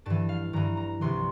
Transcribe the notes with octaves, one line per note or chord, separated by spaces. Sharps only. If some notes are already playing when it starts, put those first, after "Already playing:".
G2 E3 A5
F5
G2 E3 A#5
A#5
C2 C3 E3 C6